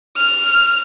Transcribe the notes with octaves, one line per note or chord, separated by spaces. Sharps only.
F6